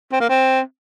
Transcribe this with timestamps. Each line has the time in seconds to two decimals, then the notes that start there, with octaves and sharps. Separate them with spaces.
0.12 C4
0.21 A#3
0.29 C4